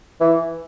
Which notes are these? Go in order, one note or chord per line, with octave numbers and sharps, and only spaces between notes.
E3